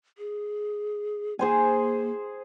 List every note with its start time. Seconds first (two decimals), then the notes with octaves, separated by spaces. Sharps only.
0.18 G#4
1.39 A#3 G#4 C5 G#5